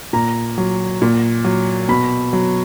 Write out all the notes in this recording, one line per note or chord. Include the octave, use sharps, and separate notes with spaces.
A#2 A#5
F#3
A#2
F#3
B2 B5
F#3